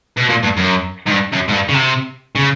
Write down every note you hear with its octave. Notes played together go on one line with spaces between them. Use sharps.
B2
A#2
G2
F#2
G#2
G2
F#2
G#2
G2
C#3
C3
C#3